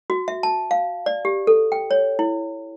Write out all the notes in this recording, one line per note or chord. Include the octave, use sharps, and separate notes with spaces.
F#4
E5
A5
F5
D5
G4
A4
G5
C#5
E4